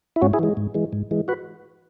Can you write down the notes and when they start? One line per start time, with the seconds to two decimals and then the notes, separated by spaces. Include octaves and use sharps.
0.16 E4
0.21 G#2 C#4 F#4
0.33 E4 G#4
0.39 E3 G#3
0.57 G#2
0.74 E3 G#3
0.93 G#2
1.11 E3 G#3
1.28 F#4 B4